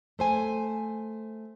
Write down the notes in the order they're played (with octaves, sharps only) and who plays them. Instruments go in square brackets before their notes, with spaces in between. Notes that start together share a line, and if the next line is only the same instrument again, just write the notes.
[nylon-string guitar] A3 C5 G#5